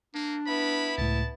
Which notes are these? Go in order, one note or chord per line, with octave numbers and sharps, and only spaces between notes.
A#3 D4
B3 E4 B5
C#2 A2 A5